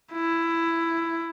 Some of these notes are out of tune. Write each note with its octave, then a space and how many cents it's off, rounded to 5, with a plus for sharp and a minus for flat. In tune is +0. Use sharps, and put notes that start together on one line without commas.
E4 +10